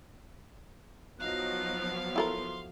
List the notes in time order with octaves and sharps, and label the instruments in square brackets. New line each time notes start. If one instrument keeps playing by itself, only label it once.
[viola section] F3 F#3 B3 [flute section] D#4 D#5 F#6 [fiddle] F5
[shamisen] E4 A4 A#4 [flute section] C6